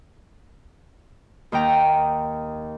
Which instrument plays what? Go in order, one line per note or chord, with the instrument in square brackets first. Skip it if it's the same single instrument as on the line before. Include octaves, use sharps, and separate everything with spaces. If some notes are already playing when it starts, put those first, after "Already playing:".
[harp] D#2 D#3 G5 A#5